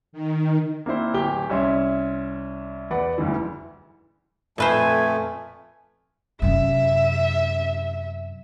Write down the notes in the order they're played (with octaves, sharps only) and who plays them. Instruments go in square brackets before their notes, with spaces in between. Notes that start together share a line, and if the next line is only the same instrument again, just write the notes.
[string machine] D#3
[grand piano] A#3 C4 E4 C5
D1 G4 G7
C2 C#4 E5 C6
E2 B4 D5 F#5
F#1 D2 G2 E3
[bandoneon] F2 A3 [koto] A#2 B4 C5 [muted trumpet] G#5
[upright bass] F#2 C3 [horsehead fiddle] E5